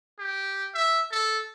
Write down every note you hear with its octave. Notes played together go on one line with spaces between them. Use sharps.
G4
E5
A4